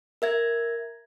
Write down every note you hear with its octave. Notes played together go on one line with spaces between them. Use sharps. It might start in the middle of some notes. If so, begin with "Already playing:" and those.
A#4 E5 G#6